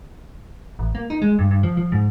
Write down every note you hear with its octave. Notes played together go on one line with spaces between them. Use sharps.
A1
A#3
D#4
G#3
G2
G2
F3
F3
G#2